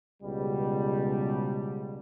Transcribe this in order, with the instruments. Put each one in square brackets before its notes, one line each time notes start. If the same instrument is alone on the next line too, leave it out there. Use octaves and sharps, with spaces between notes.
[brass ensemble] C#2 B2 G3